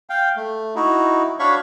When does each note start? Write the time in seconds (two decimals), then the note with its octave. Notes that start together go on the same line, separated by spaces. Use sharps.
0.10 F5 G5
0.37 A3
0.75 D#4 E4 F#4
1.39 D4 F#4 C#5 F5 B5 C#6